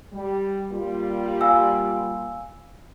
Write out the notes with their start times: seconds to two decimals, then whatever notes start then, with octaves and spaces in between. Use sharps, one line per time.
0.13 G3
0.71 G3 A#3 F4
1.41 F5 G#5 E6